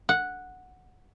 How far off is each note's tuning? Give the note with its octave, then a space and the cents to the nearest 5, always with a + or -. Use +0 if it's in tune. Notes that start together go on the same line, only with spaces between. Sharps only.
F#5 -5